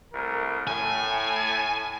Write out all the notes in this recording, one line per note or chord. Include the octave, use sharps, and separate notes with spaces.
C2 A3 A#4
A2 G#5